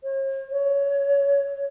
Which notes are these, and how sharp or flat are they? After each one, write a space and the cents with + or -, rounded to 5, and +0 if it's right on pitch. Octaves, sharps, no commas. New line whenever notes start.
C#5 -45
C#5 +15